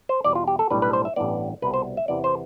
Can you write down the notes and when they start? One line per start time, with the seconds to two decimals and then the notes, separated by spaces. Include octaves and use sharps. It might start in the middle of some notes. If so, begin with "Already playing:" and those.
0.09 C5
0.24 E2 B2 G3 D5
0.35 F4
0.47 G4
0.59 A4
0.70 B1 A2 G3 D4 B4
0.82 B4
0.93 C5
1.05 E5
1.16 A1 G2 E3 B3 D5
1.62 C2 B2 G3 B3 B4
1.74 C5
1.97 E5
2.08 E2 C3 E3 B3 D5
2.24 C5